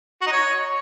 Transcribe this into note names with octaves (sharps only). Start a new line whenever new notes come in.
F#4
D#4
C#5